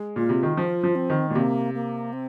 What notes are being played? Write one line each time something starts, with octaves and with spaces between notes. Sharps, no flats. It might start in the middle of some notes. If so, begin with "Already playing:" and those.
Already playing: G#3
A#2 F4
C3
D#3
F3 F4
F3
C4
D#3
A#2 G#3
C3 A#3
A#3
C4